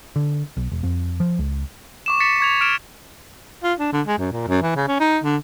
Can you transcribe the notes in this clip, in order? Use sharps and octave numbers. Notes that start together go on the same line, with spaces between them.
D3
B1
E1
F2
F3
C#2
C#6 D6 E7
A6 B6 C#7
C#6 G#6 F7
F6 D7 E7
F4
D4
D3
G#3
F#2
A#2
F#2
E3
C#3
C#4
D#4
D3